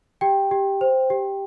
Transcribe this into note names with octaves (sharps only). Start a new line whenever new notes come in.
G4 G5
G4
C5
G4